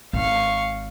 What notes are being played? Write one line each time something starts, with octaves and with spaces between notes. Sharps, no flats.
G#1 F5 C#6